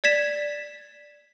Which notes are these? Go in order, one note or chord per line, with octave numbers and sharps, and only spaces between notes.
D5 G#6 B6 E7